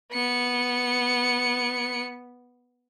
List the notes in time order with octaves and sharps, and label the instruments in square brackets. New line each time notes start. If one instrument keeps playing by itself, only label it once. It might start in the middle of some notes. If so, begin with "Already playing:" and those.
[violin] B3 C#7